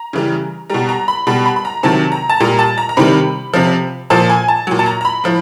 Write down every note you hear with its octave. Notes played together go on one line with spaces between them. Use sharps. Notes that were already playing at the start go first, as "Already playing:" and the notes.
Already playing: A#5
C#3 E3 G3
B2 G3 A#5
A#5
B5
B2 G3 B5
B5
B5
A#5
C3 D#3 F#3 A5
A#5
A5
A#2 G3 A#5
A5
A#5
A#5
C3 D#3 G3 B5
C3 F3
A#2 F3 A5
G#5
A5
A#2 F#3
A5
A#5
A#5
B5
A2 F3